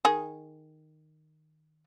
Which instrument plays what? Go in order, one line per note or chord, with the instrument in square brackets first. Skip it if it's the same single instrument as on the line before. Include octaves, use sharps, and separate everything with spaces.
[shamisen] D#3 G#4